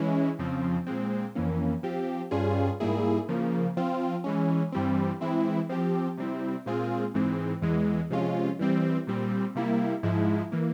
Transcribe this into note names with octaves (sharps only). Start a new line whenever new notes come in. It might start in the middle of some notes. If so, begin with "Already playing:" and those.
Already playing: E3 G#3 C#4 E4
F2 C#3 F3 C4
A#2 G#3 C4
F2 E3 A#3 C#4
F3 C4 G4
G2 G3 C#4 F4 G#4
G#2 G3 A#3 E4 G#4
C#3 F3 A#3
F3 C4 F4
E3 G#3 C#4
G2 E3 G3 C4
E3 G#3 C4 E4
F3 C4 G4
C3 G3 C4 E4
A#2 G#3 C4 F4 G#4
G#2 E3 G#3 C4
E2 E3 G#3
C3 F3 G#3 C#4 F4
E3 G3 C4
A#2 G3 C4
C3 G3 A#3 E4
G#2 F3 G#3 E4
E3 A#3